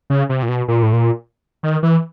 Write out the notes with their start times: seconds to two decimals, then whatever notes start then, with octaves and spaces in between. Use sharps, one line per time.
0.10 C#3
0.29 C3
0.43 A#2
0.49 B2
0.68 A#2
0.83 A2
0.93 A#2
1.63 D#3
1.83 E3